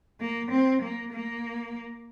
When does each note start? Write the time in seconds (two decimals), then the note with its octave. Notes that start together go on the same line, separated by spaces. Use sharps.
0.20 A#3
0.51 C4
0.82 A#3
1.13 A#3